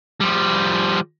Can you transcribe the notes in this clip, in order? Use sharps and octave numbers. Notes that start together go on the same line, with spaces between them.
F3 G3